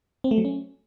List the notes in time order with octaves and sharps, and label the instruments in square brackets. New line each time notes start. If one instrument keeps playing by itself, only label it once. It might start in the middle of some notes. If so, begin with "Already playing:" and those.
[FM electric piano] C4
A3
F#3
C#4